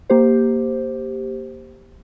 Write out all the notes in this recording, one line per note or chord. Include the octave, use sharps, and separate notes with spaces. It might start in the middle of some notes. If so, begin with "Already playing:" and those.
A#3 G4 C5